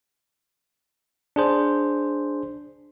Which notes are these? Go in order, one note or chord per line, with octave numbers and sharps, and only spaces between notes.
D4 G#4 C5